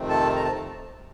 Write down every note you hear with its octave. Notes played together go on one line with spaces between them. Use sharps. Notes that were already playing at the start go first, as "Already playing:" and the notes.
Already playing: F2 C3 D#3 A3 C4
A4 A5
A#5
A5